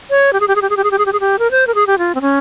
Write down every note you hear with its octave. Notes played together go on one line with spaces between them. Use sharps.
C#5
G4
G#4
G4
G#4
G4
G#4
G4
G#4
G4
G#4
G4
G#4
G4
A#4
C5
A#4
G#4
G4
F4
C4
C#4